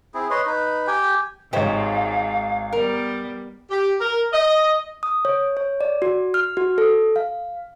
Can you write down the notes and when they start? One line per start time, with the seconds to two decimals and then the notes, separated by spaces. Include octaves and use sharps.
0.14 C4 E4 G#4
0.30 B4 C#5 D#5 C6
0.46 D#4 B4
0.87 G4 G5 G#5
1.53 G#1 G#2 G4 C5 C#5 D#5 F5
2.73 G3 B3 A#4
3.71 G4
4.01 A#4
4.33 D#5
5.03 D#6
5.25 C#5
5.57 C#5
5.81 D5
6.02 F#4
6.34 F6
6.57 F#4
6.78 A4
7.16 F5